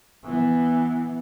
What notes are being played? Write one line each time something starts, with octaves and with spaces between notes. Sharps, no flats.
E3 B3